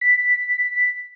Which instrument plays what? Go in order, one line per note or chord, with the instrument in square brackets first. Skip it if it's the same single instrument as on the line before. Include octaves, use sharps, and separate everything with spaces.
[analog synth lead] B6